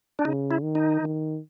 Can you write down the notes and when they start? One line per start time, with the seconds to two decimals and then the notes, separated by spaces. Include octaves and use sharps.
0.19 D4
0.25 C#3 D#4
0.51 E4
0.63 D#3
0.75 D#4
1.00 D#3